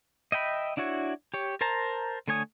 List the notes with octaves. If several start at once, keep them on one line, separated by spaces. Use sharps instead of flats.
D#5 E5 G5 B5
D4 E4 F#4 C#5
G4 C#5
A#4 C5 A5 A#5
D3 A3 C#5 G#5 D#6